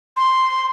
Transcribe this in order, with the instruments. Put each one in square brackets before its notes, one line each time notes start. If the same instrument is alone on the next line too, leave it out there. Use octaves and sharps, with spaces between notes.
[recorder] C6